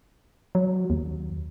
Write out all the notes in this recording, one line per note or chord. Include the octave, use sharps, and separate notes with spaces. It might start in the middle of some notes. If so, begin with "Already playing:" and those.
F#3
D#2